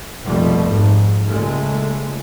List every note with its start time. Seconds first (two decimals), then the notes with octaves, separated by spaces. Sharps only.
0.23 F1 A#1 B2 F3 G3 A3
0.71 G#2
1.28 C#2 A#2 G#3 A3